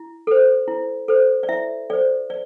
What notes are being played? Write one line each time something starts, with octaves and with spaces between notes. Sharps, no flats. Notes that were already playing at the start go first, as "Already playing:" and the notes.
Already playing: E4
A4 C5
E4
A4 C5
D5
E4 E5
A4 C5 D5
D5